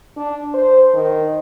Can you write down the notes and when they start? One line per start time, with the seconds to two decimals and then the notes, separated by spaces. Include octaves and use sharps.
0.17 D4
0.54 C5
0.94 D#3